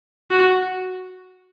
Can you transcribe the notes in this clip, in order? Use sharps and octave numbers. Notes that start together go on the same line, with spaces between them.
F#4